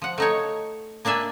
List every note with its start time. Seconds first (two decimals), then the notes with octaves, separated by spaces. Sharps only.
0.02 F3 F#5
0.18 A3 D#4 C#5
1.05 A#3 D4 D5 E5 G#5